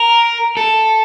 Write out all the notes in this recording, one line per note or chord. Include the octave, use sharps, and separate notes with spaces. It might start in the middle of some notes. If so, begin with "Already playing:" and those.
Already playing: A#4
A4